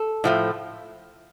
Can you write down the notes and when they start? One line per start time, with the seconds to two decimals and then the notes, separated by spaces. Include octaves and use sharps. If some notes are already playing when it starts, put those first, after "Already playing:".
Already playing: A4
0.24 A2 F3 A3